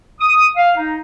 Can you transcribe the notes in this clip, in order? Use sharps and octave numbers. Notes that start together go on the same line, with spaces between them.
D#6
F5
D#4